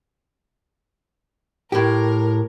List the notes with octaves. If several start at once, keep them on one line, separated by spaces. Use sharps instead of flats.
A2 G4 A#4